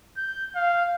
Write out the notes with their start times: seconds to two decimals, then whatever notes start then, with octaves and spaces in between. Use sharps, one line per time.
0.17 G6
0.55 F5